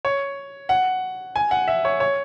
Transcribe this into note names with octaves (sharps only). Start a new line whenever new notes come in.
C#5
F#5
G#5
F#5
E5
C#5
C#5